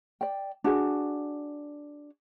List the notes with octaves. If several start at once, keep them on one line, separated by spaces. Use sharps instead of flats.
D5 G5
D4 F#4 G#4